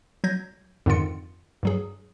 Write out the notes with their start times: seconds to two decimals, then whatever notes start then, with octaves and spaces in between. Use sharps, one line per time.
0.24 F#3 G6 G#6 A#6
0.86 F2 G#2 D3 D#3 F4 C#7
1.63 G2 F#3 G#4